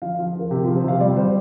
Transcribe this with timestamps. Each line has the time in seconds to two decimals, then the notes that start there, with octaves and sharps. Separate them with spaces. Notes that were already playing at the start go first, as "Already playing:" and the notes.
0.02 F3 F5
0.14 F5
0.19 F3
0.36 F3 A#4
0.51 C3 G4
0.64 F3 F4
0.76 C5
0.84 C3 F5
1.00 G3 D5
1.16 G3 C5